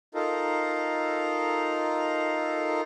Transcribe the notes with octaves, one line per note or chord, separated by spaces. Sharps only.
D#4 F4 A4 A#4